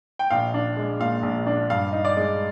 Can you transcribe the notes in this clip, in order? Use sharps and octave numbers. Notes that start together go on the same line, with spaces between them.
G5
A#1 F5
D4
G#3
A#2 F5
A#1
D4
G2 F5
D#4
D5
G#3